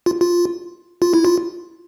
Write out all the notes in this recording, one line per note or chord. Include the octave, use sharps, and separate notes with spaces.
F4
F4
F4
E4
F4